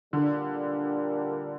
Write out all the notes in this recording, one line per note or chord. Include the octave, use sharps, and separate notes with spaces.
A#2 D3 G3 D4 G4 A#4